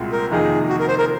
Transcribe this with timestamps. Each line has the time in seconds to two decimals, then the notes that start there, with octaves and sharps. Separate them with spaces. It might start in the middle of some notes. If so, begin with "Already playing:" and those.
Already playing: C2 A#2 G#3 C4 F#4
0.12 A#4
0.31 F2 C3 D#3 A#3 D#4 G#4
0.69 F#4
0.79 A#4
0.88 C5
0.98 A#4